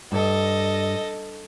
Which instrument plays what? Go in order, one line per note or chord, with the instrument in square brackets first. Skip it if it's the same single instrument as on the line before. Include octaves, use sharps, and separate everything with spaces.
[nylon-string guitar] G2 [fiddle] A4 D#5